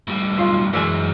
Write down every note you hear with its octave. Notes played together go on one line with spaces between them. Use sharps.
A2 G3
B1 F4
F#2 E3 F#3 G#3 G#5